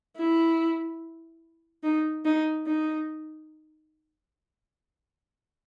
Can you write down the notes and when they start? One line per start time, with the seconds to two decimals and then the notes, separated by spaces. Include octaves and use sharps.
0.17 E4
1.83 D#4
2.25 D#4
2.67 D#4